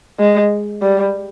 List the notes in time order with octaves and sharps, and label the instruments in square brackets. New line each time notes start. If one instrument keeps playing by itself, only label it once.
[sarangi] G#3
G3